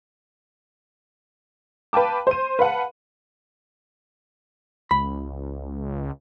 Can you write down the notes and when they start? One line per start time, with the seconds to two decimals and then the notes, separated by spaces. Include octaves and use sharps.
1.93 B4 F5 G5 A5 D6
2.27 C5 D#7
2.59 B4 F5 F#5 A5
4.91 C#2 B5